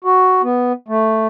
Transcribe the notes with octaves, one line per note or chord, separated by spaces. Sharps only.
F#4
B3
A3